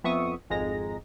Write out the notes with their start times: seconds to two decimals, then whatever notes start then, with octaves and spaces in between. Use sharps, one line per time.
0.04 F2 B3 E5 C#6 D#6
0.50 G#1 F2 G#3 A#5 A#6